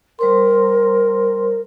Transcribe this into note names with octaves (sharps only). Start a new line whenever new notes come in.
G3 A#4 C5 C6